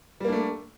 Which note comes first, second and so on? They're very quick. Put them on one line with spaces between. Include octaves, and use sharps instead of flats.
G3 A#3 D4 A3